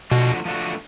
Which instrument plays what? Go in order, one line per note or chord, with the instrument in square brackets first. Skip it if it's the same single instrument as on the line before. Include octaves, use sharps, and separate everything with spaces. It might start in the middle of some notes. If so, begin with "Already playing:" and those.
[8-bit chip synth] B2 [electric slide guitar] F3 A3 D4 F#4
[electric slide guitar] F3 A3 D4 F#4